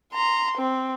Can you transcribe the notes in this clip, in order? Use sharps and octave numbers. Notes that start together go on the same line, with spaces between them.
A#5 C6
C4